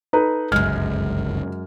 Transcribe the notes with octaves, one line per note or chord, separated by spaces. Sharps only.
D#4 A4 B4
G1 C#2 F#2 G#3 F6